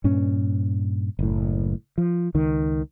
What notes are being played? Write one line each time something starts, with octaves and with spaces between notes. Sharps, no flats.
G2 A#2 C#4
F#1 A2
F3
C#2 D#3